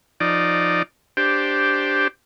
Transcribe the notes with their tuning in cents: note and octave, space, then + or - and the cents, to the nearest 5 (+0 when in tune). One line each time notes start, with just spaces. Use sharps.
F3 +0 D#4 -10 D5 +0
D4 +0 G4 +0 C5 +0